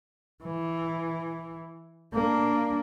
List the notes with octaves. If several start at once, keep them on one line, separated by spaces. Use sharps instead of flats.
E3
A#3 D4